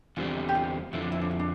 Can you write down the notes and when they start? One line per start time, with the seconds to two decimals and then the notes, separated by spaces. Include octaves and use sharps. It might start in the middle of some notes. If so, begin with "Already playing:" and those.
0.16 E2 D3 G3 C4 F4
0.49 G4
0.55 F4
0.93 F2 D3 F3 E4
1.02 D4
1.12 E4
1.21 D4
1.31 E4
1.39 D4